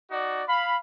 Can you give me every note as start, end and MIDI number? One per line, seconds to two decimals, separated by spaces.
0.10 0.42 63
0.10 0.42 66
0.10 0.42 74
0.47 0.76 77
0.47 0.76 83